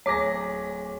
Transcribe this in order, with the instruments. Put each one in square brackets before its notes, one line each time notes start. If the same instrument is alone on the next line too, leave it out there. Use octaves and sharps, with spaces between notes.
[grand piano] D1 G#4 A#6 [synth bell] C#5 D6